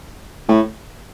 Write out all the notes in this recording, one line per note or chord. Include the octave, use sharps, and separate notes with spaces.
A2